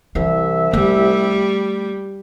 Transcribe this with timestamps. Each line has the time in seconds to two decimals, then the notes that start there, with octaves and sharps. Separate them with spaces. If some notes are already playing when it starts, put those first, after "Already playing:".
0.15 C2 E3 E5
0.73 G3 A3